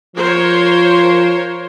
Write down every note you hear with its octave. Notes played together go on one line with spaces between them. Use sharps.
F3 A#4 C5 C#5